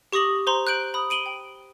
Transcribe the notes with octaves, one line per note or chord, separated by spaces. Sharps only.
G4 C#6 D#6 A#6 F#7
C5 A#5 C6
F#6 G6 D7 F#7
B5 D#6
D7 D#7 F#7 G7
G5